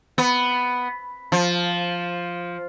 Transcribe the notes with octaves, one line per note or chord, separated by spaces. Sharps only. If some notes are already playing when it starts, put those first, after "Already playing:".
B3
F3